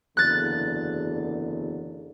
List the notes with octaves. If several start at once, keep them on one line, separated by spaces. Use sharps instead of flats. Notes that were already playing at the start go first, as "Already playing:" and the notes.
F#1 E2 D3 F#6 A6